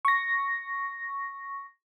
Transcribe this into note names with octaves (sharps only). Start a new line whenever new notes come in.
C#6 A#6